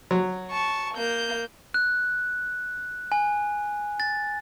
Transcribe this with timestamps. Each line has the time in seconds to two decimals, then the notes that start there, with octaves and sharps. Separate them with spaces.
0.11 F#3
0.51 A5 C#6
0.95 A#3 G6
1.74 F#6
3.12 G#5
4.00 A6